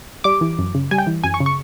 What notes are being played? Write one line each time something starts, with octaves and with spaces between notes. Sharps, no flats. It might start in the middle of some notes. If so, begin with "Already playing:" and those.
G3 D6
E3
F#2
C#3
G3 G#5
G5
E3
F#2 G#5
C#6
C#3
C#6